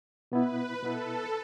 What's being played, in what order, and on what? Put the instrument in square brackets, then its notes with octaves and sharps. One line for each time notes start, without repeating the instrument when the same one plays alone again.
[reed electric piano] B2 B3 E4 [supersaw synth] B4
[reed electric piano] B2 B3 E4 [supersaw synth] A4